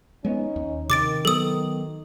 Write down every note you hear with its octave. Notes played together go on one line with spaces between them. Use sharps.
G#3 B3 C#4 D#4
D#2
C3 D#3 D6 A6 D7
F#3 B3 A4 D#6